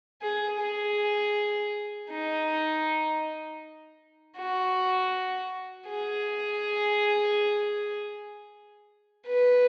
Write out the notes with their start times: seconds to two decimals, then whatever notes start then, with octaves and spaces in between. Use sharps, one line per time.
0.22 G#4
0.60 G#4
2.11 D#4
4.37 F#4
5.87 G#4
9.27 B4